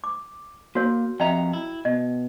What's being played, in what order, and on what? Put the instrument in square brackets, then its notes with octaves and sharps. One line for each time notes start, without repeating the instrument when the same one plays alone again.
[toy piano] D6
[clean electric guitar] A#3 [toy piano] F#4 A#4 C#5
[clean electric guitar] F2 A#5 [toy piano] D#5 E5 G5
[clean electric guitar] E4
[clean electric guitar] B2 [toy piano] D#5